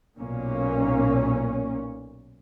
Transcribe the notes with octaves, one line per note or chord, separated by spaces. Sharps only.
B1 A#2 A#3 C#4